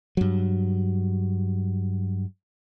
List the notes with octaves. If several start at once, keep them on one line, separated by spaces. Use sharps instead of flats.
G2 F#3